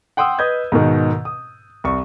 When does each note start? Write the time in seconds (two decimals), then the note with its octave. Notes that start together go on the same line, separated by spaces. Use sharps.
0.17 F#5 G5 C6 D#6 E6
0.39 B4 D#5 D#6 G6 G#6
0.72 G#2 B2 D#3
1.25 D#6
1.84 C2 C#6